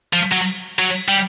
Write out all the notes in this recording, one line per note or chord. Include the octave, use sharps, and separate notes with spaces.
F3
F#3
F#3
G3